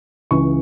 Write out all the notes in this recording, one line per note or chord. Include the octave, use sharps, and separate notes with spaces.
C#2 C#3 E3 C#6